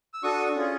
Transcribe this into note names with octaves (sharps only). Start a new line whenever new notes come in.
E6
D4 F#4 A4 C#6 D#6
C#4 F4 G#4